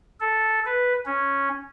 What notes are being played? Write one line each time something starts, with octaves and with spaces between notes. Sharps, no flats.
A4
B4
C#4